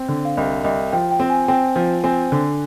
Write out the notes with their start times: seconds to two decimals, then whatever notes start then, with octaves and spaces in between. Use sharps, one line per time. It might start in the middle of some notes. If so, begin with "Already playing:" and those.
Already playing: C4
0.08 D3
0.25 F5
0.37 C2 D#5
0.64 C2 D#5
0.92 F3 G5
1.11 G5
1.20 C4
1.30 G#5
1.48 C4 G5
1.76 F3
2.04 C4 G#5
2.32 D3